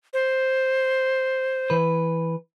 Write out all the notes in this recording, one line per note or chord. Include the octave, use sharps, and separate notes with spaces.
C5
E3 B4